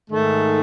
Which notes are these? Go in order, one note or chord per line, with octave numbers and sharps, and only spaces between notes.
G#2 D#3 A3